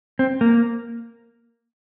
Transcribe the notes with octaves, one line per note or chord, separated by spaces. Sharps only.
C4
A#3